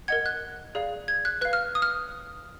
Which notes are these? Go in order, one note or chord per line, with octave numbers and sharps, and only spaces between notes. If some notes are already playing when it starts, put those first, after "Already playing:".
A#4 D#5 F#5 G#6
F#6
G#4 D5 F5
G#6
F#6
B4 F5 F#6
F6
D#6
F6